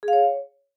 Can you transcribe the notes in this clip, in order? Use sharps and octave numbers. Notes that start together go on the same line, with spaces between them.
G#4
F5
C#5